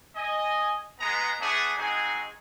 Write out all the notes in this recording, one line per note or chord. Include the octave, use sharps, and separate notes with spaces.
D#5 G#5
G#3 B3 A#5
A3 B3 D4 G#4 E5 F#5
G#3 C4 D#4 F#4 G#4 G#5